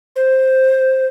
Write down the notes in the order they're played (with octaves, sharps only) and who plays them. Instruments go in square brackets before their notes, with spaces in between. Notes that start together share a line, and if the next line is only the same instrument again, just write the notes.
[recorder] C5